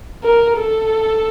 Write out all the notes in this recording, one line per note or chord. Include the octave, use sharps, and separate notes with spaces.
A#4
A4